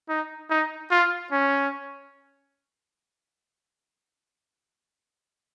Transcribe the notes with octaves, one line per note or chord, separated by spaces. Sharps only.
D#4
D#4
F4
C#4